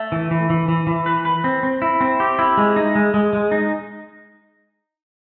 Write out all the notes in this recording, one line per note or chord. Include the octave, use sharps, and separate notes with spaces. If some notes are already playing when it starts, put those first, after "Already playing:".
Already playing: A3
E3
E3
E3
E3
E3
B4
B4
C4
C4
E4
C4
G4
E4
G#3
D#4
G#3
G#3
G#3
D#4